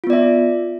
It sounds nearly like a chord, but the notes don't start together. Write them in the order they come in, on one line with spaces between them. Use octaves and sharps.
F4 B3 D5 E5